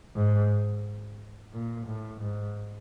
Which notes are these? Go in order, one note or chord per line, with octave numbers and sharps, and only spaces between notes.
G#2
A#2
A2
G#2